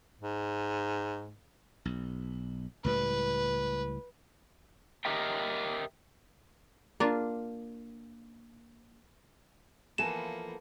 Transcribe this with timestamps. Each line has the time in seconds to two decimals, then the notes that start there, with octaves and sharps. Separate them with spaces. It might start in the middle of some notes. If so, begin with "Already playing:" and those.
0.20 G#2
1.85 B1
2.84 C#2 A2 G3 B4
5.05 G4 A#4 D#5 E5 G5
7.00 A#3 D4 F4
9.98 E3 F3 A#3 B3 A4 G#5 E7